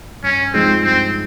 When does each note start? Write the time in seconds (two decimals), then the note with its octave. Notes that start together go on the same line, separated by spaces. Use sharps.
0.23 G2 C#4
0.53 F3 G#3 C4 D#4 G#4
0.83 G2 C4